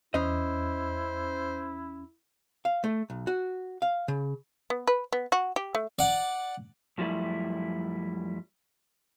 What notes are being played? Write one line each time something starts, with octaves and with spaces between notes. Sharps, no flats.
E2 C#4 E4 C5 D#5
F5
A3
B1
F#4
F5
C#3
B3
B4
B3
F#4
G4
A3
D5 F#5
F#2 F3 G3 A3 E4